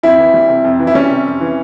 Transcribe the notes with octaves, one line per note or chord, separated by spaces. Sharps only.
F2 E4
E3
G3
C3
F2
E3
E4
G3 C#4
C3
F2
E3